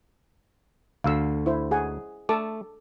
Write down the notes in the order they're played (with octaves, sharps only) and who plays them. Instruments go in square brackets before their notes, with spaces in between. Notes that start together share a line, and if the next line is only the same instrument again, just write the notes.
[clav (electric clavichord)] D2 D3 [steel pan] F5 E6
[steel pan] E4 C5
G#4 F#5 G#5
[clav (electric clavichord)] A3 [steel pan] A4 A5 D6